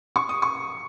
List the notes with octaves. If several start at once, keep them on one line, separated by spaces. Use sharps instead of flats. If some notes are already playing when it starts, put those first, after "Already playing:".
C#6
D#6
C#6